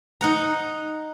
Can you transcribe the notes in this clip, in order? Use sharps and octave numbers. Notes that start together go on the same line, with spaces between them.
D#4 F#5 A#5